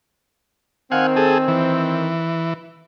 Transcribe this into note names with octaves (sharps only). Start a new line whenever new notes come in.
D#3 C4 F5 F#5 G#5
G#4 A4
E3